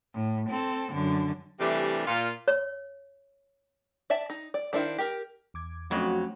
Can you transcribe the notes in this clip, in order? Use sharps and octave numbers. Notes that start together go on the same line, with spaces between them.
A2
C4 A4
F#2 D3
C3 E3 G3 A3 D4
A#2 F4
C#5
D5 E5 A5
D#4
D5
D#3 D4 E4 C5 F5
G4 A#4
E2 D6 G#6
F2 F#3 A3 C#4 D4 F#4